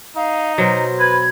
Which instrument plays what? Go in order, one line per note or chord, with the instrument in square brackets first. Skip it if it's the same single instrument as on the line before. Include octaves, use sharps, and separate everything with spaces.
[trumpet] D#4 [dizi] F5
[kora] B2 F#3 [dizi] C5
[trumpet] B4 [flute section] B5 G#6